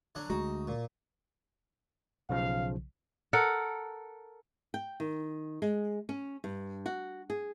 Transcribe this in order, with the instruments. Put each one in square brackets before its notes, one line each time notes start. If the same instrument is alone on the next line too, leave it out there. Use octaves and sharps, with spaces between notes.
[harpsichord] D3 F#3 D4
[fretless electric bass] D2 G#3 [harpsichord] D#4 [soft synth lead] F#4
[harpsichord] A#2
[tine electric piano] B1 C#3 F3 [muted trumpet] F5
[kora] A4 A#4 F#5
[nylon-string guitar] G5
D#3
G#3
C#4
G2
F#4
G#4